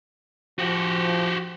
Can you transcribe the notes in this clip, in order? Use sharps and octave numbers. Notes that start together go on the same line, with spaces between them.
F3 F#4 G4